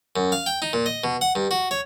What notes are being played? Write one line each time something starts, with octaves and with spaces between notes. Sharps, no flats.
F#2
F5
G5
D#4
A#2
D#5
B2
F#5
G2
F#4
C#5